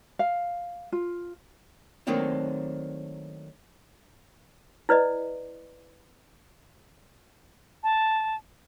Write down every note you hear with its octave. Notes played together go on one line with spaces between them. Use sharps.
F5
F4
D#3 F#3 A3 A#3 C4 D4
E4 B4 D5 D#5
A5